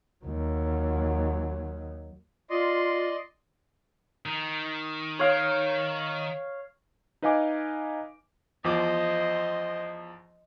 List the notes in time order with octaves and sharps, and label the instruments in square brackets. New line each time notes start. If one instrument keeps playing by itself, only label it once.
[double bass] D#2 F#3
[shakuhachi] F4 [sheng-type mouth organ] D5 D#5 C6
[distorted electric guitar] D#3
[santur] C#5 F5
[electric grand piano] D#4 B4 D#5 F5 G#5 D6
[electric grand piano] E2 F3 D6 [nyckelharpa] C5 D#5